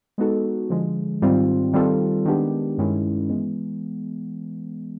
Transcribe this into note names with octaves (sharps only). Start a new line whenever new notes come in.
G#3 B3 D#4 F#4 A4
D3 F3 G#3
G#2 D#3 G3 C4 F4
D#3 G3 C4 F4 A4
D#3 G#3 B3 D4 G4
G2 D#3 G#3 C#4 E4
E3 G#3 B3